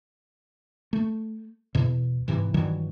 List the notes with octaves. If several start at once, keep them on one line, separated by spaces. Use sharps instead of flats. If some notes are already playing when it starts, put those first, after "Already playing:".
A3
E2 B2
G#2 C3 E3
G2 D#3 E3 F#3